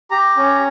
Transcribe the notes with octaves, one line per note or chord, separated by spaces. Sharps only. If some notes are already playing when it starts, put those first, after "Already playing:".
G4 A#5
C#4